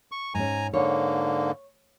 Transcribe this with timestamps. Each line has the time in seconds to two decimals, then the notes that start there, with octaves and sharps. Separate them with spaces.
0.12 C#6
0.35 G#2 C#4 G#5 A#5
0.73 G#2 D3 A#3 C#5